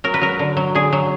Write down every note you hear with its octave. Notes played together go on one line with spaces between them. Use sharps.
F#3 A#4
B4
F#3 A#4
D3
F#3
D3 G#4
F#3